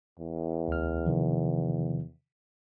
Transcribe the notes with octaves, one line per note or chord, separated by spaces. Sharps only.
E2
D2 F6
C3 D#3 F3